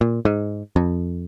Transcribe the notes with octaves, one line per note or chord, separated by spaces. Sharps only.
A#2
G#2
F2